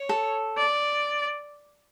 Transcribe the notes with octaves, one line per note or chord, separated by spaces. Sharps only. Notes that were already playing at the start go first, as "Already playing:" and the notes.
Already playing: C#5
A4
D5